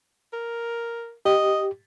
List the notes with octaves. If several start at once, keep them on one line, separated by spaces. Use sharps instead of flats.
A#4
G4 D#5